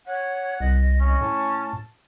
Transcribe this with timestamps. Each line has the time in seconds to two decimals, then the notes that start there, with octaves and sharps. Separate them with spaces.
0.07 C#5 F#5
0.60 C2 D#5
1.00 C#4
1.21 A2 A5